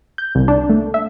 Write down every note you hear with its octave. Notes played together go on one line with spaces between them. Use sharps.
G6
C2
D4
A3
E5